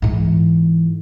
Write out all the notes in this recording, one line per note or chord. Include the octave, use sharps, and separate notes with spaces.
G#2 E3